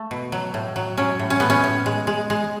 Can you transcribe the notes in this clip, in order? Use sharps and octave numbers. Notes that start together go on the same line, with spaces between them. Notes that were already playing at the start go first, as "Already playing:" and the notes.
Already playing: A3
B2
F#3
A2
F#3
F#3 C#4
A2
C#4
A2 B3
C#4
A2
G#3
G#3
G#3